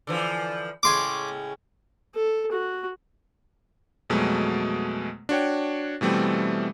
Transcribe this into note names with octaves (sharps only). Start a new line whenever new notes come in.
D3 E3 F3
A2 C#3 G#3 G#5 C6 D6
A4
F#4
F2 B2 F#3 G#3 A3
D4 F#4 C#5 G5
B2 E3 G3 A3 C4